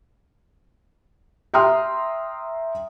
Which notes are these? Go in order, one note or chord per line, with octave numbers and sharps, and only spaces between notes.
E5 G5 A#5 C6 D#6 F6